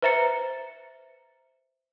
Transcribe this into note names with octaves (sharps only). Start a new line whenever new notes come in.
B4 C5 E5 A#5 A6 C#7